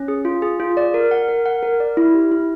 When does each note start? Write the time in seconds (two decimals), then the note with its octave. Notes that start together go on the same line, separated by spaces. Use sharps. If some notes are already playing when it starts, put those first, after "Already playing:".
Already playing: C#4
0.08 G#4
0.25 F4
0.42 G#4
0.60 F4
0.77 D5
0.94 A#4
1.11 F#5
1.28 A#4
1.46 F#5
1.63 A#4
1.80 D5
1.97 E4
2.14 G4
2.31 E4